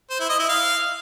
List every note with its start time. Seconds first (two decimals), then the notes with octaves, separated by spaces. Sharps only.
0.10 C5
0.20 E4
0.30 D#5
0.39 E4
0.49 F5